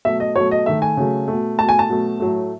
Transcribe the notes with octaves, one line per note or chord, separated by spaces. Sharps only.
B2 F#3 A3 E5
D#5
B2 F#3 A3 C#5
D#5
D#3 A3 E5
G#5
C#3 F#3 A3
B2 A3
B2 A3 A5
G#5
A5
B2 F#3 A3
A2 F#3 A3